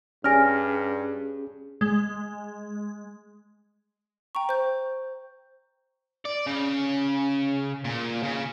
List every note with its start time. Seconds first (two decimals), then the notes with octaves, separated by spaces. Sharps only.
0.24 G2 C#4 G4 G#4 D5 G#5 F6 A#6
1.81 G#3
4.35 G5 A#5 C#6
4.49 C5 G6
6.25 D5
6.46 C#3
7.84 A#2
8.23 C#3